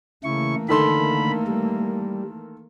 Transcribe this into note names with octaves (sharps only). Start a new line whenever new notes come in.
C#3 E3 A3 A#3 E4 C#6
D3 D#3 A4 B5 C6
G3